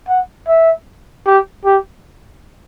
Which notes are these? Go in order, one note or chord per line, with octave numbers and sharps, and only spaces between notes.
F#5
E5
G4
G4